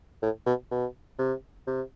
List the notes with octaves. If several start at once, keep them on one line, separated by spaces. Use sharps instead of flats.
A2
B2
B2
C3
C3